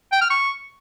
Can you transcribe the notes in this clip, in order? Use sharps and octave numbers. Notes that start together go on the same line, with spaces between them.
G5
F6
C#6